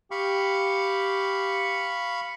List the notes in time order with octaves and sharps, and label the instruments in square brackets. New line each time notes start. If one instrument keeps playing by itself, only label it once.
[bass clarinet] G4 [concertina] F5 B5 C#6